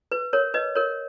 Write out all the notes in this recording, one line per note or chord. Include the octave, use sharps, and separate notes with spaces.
B4
A#4 C#5
B4 D#5
A#4 C#5